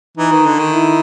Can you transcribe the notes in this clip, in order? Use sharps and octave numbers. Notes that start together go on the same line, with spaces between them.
E3 D#4
D#3
D3
D#3
E4